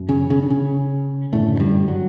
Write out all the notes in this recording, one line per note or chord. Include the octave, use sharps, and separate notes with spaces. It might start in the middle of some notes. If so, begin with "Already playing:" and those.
Already playing: F#2
C#3 C#4
C#3 C#4
D4
C#3 C#4
F#2 A2 D3 A3
F#3
G2 G3
F#3